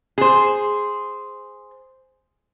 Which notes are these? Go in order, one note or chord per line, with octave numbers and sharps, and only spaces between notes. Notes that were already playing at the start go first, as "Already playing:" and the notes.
G#4 C5